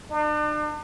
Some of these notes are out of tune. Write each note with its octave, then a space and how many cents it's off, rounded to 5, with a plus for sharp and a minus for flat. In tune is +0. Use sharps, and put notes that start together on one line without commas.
D4 +40